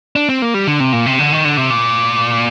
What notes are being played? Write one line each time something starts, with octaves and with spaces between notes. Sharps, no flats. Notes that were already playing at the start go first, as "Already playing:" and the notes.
D4
C4
A#3
G3
D3
C3
A#2
C3
D3
D#3
D3
C3
A#2